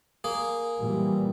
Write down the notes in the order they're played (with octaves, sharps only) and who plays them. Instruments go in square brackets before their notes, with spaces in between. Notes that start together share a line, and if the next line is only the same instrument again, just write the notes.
[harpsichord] A#3 G#4
[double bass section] A#2 E3 G3